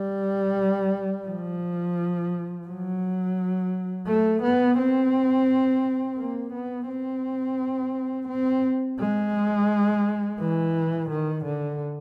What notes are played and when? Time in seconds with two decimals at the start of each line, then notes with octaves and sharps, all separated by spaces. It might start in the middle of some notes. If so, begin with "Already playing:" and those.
Already playing: G3
1.27 F3
2.67 F#3
4.07 A3
4.43 B3
4.78 C4
6.18 A#3
6.54 B3
6.89 C4
8.29 C4
9.00 G#3
10.40 E3
11.10 D#3
11.45 D3